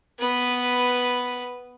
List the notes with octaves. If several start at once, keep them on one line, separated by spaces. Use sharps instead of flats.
B3 B4